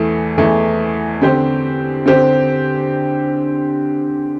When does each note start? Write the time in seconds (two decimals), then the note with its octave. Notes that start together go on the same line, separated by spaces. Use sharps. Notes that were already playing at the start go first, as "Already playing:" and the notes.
Already playing: E2 E3 A3
0.38 E2 E3 A3
1.22 D3 C4 G4 C5
2.06 D3 C4 G4 C5